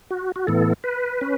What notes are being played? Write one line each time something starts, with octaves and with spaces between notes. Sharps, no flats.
F#4
F#4
A2 E3 B3 A4
B4
C#4